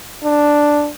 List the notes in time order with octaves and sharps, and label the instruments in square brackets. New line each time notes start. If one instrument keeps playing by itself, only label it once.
[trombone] D4